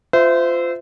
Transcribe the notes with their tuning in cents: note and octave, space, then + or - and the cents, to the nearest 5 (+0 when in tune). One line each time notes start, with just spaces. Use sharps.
F4 +0 C5 -30 E5 +0